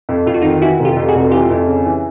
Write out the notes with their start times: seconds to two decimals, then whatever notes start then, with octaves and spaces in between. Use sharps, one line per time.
0.09 F2
0.26 F2 F4
0.34 F#4
0.42 D#3 D#4 F4
0.61 E3 E4 F#4
0.79 F1
0.85 F4 G4
0.97 F2
1.08 F#4 G#4
1.15 F1
1.31 E3 F4 G4
1.50 F2
1.67 C#3
1.85 E3